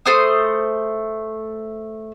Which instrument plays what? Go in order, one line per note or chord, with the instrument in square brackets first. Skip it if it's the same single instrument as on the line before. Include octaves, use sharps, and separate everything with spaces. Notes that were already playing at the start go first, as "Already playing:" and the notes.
[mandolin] A3 C5 D#6